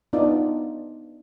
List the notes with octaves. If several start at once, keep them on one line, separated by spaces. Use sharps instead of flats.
B3 D4 D#4 F4 D5